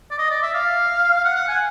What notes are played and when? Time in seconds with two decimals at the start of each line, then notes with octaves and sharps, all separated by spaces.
0.11 D5
0.19 D#5
0.30 D5
0.43 E5
0.54 F5
1.25 F#5
1.35 F#5
1.48 G#5